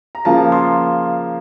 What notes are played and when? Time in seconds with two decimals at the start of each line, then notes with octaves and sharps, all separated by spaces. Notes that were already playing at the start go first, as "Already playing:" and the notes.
0.15 A#5
0.25 C#3 F3 A#3 A5
0.52 C6